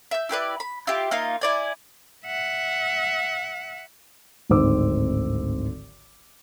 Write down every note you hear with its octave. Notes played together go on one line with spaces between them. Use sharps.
E5 G6
E4 G4 B4 D5
B5
E4 F4 G4
A#3 D#4 F4
E4 D5 G#5
E5 F#5
D1 G#1 D#3 C4 D6 E6